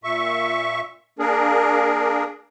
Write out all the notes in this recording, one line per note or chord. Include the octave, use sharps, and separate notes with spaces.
A#2 E5 C#6
A#3 D4 G#4 A#4